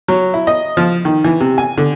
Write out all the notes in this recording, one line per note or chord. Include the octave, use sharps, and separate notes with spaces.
F#3
E4
D#5
F3
D#3
E3
C3
G#5
D3